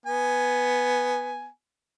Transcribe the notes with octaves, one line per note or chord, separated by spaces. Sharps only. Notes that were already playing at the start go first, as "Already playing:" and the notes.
B3 G#5